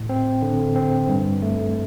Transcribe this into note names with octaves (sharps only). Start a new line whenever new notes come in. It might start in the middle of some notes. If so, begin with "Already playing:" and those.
Already playing: A2
C4
D3
C4
G2
A3